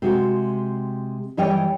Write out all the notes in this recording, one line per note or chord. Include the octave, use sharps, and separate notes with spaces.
C3 G#3 F#4
G2 E3 G3 C#5 D#5 G5